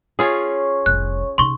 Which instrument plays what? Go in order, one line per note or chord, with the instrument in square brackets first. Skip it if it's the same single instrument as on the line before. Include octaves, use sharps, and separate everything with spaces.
[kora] C#4 F4 G#4 [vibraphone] C#5 C#6
[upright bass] F1 C2 [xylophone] F#6
[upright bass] C3 D#4 [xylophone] C6 C#6